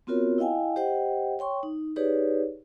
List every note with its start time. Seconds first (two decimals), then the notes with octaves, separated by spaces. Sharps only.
0.07 B3 C4 F4 F#4 A#4 C#5
0.38 E4 D#5 F5 G5 G#5
0.76 G4 C5 D#5 F#5 G5
1.39 C#5 G5 C6 C#6
1.63 D#4
1.96 D#4 G4 G#4 B4 C#5 D5